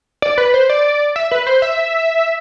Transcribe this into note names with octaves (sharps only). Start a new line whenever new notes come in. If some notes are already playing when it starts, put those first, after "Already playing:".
D5
B4
C5
D5
E5
B4
C5
E5